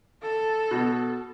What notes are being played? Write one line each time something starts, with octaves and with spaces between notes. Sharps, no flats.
A4
B2